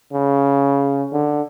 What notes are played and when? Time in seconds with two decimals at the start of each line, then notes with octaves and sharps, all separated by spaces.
0.13 C#3
1.13 D3